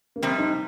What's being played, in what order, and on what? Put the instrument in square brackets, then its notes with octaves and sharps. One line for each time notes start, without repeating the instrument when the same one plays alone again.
[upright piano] A#3
[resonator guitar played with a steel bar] F2 C3 G3 [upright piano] C4
[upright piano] D#4